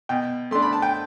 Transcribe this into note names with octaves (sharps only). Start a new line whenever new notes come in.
B2 G5
A3 D4 C6
B5
A5
G5